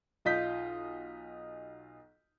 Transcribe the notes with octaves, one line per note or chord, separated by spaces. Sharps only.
B1 F4 D#5 G6 B6